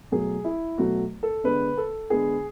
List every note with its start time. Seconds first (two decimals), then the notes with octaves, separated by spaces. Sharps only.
0.11 B2 F#3 A3 G#4
0.44 E4
0.78 B2 F#3 A3 F#4
1.23 A4
1.44 D3 G#3 B3 B4
1.77 A4
2.10 D3 G#3 B3 G#4